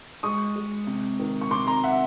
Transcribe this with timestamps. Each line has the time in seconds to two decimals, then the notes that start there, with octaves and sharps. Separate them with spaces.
0.23 G#3 C#6 D#6
0.56 G#3
0.87 C3
1.19 D#3
1.41 C#6
1.51 C3 C6 D6
1.67 A#5 C6
1.84 E5 F#5